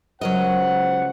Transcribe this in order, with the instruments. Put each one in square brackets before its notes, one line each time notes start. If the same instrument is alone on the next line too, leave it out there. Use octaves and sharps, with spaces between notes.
[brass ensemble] C#2 C5 F#5 [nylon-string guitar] F#3 A#4 D#5